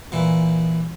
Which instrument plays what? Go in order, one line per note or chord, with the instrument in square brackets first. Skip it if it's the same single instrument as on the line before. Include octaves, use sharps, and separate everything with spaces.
[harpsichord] A#2 E3